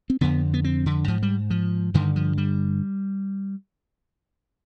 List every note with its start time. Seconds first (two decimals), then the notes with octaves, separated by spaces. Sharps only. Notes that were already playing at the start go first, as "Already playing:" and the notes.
0.10 C4
0.21 F2 D3 B3
0.54 B3
0.64 C4
0.86 D3
1.08 G#2 F3
1.23 G3
1.50 F3
1.94 G2 D3 D#3
2.16 F3
2.38 G3